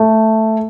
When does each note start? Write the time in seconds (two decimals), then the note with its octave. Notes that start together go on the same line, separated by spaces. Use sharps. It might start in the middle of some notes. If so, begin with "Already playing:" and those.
Already playing: A3